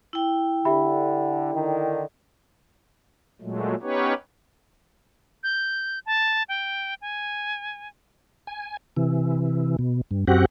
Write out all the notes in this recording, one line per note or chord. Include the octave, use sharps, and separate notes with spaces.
E4 G5
D3 G4 E5 B5
D3 D#3
A#2 F#3 G#3 A3
B3 C#4 D#4 G4 B4 C#5
G6
A5
G5
G#5
G#5
C3 E3
B2
G2
F#2 C4 F#4 G4 F#5